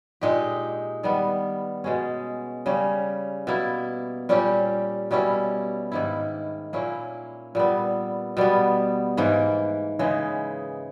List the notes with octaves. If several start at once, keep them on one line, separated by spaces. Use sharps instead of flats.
A#2 G#3 D#4 G4
D#3 G3 B3
B2 G#3 C#4
C#3 G3 C#4
B2 A#3 E4
A#2 G3 C#4 G4
B2 G3 C#4 E4
G#2 D#3 A#3 E4
A#2 A#3 C#4 E4
A#2 G3 B3
B2 G3 B3
G#2 E3 A#3
C#3 E3 G#3 D#4